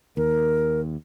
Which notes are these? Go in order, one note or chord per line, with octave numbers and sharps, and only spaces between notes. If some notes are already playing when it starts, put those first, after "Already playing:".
D#2 A#4